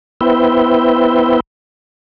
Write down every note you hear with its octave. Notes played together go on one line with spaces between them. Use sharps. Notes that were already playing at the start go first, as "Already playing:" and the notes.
B3 E4 B4 C5 E5 G5